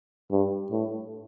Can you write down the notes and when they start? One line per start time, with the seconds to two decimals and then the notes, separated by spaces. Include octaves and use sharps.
0.31 G2
0.71 A2